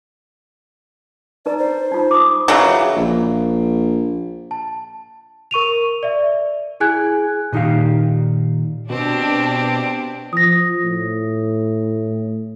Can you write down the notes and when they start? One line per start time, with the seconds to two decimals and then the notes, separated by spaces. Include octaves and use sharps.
1.46 D#4 B4 D5 A#5
1.58 C5
1.92 D#4 F4
2.11 D6 D#6
2.48 C#3 E3 F#3 D#5
2.96 A#1
4.51 A5
5.51 A#4 C#6 D#7 F7
6.03 D5 E5
6.80 E4 G#4 G#5 F#6 G#6
7.53 A#2 D#3 D#4 G4 F5
8.90 B2 C4 D4 G4
10.33 F3 D#6 A#6
10.85 A2